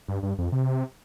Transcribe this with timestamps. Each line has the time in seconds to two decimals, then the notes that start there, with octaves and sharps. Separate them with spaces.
0.08 G2
0.23 G2
0.39 F2
0.52 C3